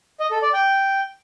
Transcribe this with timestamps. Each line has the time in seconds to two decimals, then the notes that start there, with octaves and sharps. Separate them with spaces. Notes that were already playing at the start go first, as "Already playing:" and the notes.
0.20 D#5
0.31 A4
0.42 D5
0.53 G5